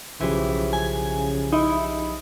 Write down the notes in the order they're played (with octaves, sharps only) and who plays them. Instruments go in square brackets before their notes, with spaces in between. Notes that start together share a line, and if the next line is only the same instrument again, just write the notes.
[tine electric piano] B1 F3 G4 [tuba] C#3 [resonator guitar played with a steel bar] E3
[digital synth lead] G#5
[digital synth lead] D#4 [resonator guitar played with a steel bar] E4